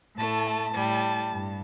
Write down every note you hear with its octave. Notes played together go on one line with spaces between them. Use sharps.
A2 A3 A5
A5
A2 G3
G2